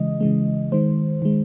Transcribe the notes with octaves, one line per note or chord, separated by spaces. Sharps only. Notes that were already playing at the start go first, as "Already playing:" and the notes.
Already playing: C#3 E3 G#3 D#5
C#3 E3 G#3
D#3 G#3 C5
D#3 G#3